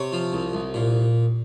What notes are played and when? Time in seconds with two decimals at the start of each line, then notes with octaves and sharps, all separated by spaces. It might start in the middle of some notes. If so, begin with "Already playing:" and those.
Already playing: C3 C#5
0.12 F3
0.33 C2
0.53 C2
0.74 A#2